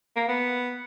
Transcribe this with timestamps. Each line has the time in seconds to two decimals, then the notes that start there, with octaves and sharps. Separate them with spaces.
0.16 A#3
0.28 B3